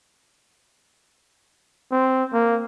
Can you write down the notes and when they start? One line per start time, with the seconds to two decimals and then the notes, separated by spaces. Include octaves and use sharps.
1.92 C4
2.33 A#3